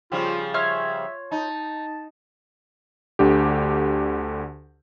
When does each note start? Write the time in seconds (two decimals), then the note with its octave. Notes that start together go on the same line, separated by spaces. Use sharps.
0.12 C#3 F3 G3 F4
0.54 F4 C#5 E5 F6
1.31 D#4 A5
3.19 D2 D3 G4